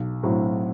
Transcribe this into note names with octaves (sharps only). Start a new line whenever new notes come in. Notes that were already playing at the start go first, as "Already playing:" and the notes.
Already playing: B1
A2 F#3 C4